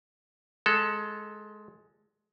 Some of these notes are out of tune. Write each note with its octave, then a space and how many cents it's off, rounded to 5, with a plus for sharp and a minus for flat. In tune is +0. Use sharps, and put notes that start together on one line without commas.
G#3 +15 A4 +0